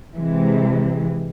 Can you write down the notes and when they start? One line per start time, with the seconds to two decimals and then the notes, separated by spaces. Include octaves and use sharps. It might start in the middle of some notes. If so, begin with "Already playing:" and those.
0.17 C3 E3 G#3